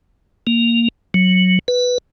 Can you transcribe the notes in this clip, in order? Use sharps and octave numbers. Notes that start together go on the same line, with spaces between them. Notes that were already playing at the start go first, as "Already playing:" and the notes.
A#3
F#3
B4